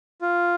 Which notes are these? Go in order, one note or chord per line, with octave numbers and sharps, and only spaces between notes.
F4